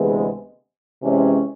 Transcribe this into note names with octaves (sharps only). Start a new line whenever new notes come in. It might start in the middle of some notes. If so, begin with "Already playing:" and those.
Already playing: D2 C3 E3 G#3 B3
C3 E3 G#3 C#4